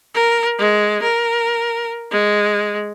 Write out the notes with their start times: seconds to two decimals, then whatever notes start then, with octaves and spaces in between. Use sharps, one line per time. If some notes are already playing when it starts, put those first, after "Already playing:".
0.14 A#4
0.59 G#3
1.02 A#4
2.11 G#3